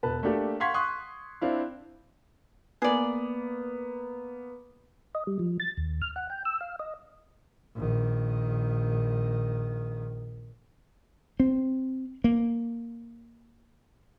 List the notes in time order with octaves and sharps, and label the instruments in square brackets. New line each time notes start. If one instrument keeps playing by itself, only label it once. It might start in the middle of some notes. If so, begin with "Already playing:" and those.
[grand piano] E1 B4 A5
A3 A#3 D4 G4 A4
F5 F#5 C6 C#6 G#6 B6
C6 C#6 D#6 F#6
C4 D4 E4 F5
[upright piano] A#3 B3 [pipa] G#4 D5
[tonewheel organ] D#5
G3
F3
A6
D#2
F6
F#5
G5
E6
F5
D#5
[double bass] A#1 D#3
[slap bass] C4
A#3